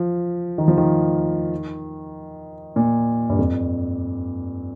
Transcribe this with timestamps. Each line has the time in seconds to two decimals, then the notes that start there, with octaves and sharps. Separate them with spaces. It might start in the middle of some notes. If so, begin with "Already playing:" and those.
Already playing: F3
0.58 D#3
0.68 F3
0.78 D#3
2.76 A#2
3.29 G2
3.39 F2